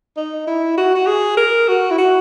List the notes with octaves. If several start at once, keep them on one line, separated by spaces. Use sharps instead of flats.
D#4
E4
F#4
F#4
G#4
A#4
F#4
E4
F#4